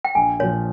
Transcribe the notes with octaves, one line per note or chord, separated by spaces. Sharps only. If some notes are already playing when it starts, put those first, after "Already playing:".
G5
A#1 G#5
A#2 F3 C#5